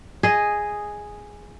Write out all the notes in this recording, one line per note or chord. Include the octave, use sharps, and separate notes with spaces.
G#4 D#5